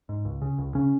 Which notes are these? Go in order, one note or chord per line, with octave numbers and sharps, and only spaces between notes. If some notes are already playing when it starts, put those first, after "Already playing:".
G#2
C#2
C#3
C#2
C#3 C#4